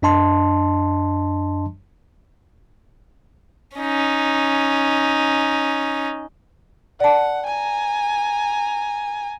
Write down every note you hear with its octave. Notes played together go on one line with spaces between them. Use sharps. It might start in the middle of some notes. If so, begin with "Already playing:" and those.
F#2 D4 D#5 A5 C6
C#4 D#4
D5 F#5 A5
G#5 A#5